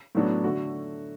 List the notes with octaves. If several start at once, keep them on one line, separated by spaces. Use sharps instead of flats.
A2 F#3 B3 D4 F#4
D3 A3 F#4